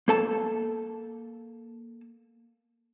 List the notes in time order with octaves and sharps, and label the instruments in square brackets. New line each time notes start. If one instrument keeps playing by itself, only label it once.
[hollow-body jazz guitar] A#3 A4 A5